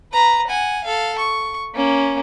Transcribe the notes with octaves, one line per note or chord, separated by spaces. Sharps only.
B4 A#5
F#5 G#5
A4 F5
C#6
A#3 C#4